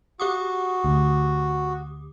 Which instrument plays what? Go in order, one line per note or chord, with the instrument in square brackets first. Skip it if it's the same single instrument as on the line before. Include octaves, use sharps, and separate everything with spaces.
[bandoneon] F#4 [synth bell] G4 D6 D#6
[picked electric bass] D2